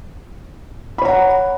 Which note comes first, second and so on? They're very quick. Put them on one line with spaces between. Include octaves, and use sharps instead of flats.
B5 C#5 A#5 F#5